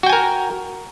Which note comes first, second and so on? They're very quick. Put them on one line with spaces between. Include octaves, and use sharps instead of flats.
F#4 G5 G#5 A#4